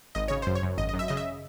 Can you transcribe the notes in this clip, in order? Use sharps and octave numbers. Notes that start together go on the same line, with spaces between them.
G#1 D#5
C#3 C#5
F#2 C5
C#5
F#2
G#1 D#5
D#5
F#2
E5
C#3 D#5
E5